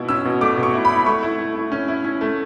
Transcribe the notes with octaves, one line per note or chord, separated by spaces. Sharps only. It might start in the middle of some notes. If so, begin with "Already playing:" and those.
Already playing: B2 E4
C#4 E6
B2
A3 D6
B2
C#6
E4
B5
E4
A3 C#6
E4
A3
E4
C#4
E4
C#4
A3